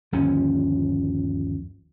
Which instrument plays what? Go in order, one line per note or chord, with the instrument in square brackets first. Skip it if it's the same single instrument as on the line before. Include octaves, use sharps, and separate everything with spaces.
[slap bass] G1 D#2 F3 C#4